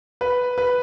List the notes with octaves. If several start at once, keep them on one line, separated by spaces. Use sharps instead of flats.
B4
B4